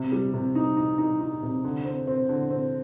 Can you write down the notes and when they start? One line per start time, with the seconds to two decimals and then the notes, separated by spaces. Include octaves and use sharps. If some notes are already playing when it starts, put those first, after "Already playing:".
Already playing: C3
0.12 G3
0.33 C3
0.55 D#4
0.77 D#4
0.98 D#4
1.20 D#4
1.43 C3
1.64 D3
1.85 C4
2.07 C4
2.29 D3
2.50 C4